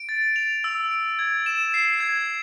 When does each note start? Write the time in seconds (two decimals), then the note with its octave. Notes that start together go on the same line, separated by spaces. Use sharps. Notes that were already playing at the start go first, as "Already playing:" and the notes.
Already playing: D7
0.09 A6
0.36 F7
0.64 E6
0.91 D7
1.19 G#6
1.46 E7
1.74 C7
2.00 G#6